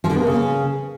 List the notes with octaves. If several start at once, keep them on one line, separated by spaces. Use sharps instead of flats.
F3
D3
B3
A#3
C#3